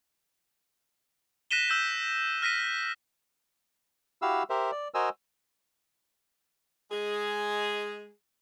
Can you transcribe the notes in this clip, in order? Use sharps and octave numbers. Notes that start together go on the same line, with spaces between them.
F#6 A#6 B6 D#7 E7 G7
E6 G6 E7
F6 A#6 B6 D#7
E4 F#4 G4 F5 E6
G4 A#4 C5 E5
D5
F#4 A#4 C5 D#5 G#5 E6
G#3 G#4